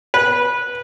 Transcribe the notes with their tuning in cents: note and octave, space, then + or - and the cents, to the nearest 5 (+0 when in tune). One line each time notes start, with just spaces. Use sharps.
B4 -15